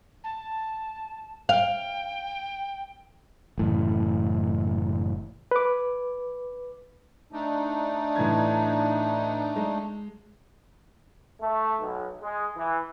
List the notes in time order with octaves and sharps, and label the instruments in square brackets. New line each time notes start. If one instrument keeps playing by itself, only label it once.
[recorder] A5
[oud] F5 [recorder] G5
[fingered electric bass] F#1 A2 E3
[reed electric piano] B4 D6
[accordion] A3 D4 D#4
[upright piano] A2 E3 G#6
G#3
[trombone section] A3
B1
G#3
E3